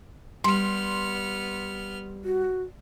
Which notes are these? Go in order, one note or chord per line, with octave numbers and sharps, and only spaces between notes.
G3 B3 C6 F6
F#4